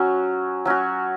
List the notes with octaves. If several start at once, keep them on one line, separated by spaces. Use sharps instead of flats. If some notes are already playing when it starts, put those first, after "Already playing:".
Already playing: F#3 C#4 F#4
F#3 C#4 F#4